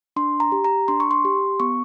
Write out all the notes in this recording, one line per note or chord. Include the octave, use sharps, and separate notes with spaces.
D4 C6
A#5
G4
A#5
D4 C6
C#6
C6
G4
B3 C#6